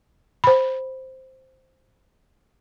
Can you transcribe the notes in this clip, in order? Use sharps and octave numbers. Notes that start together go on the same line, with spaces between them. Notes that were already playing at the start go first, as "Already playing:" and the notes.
C5 B5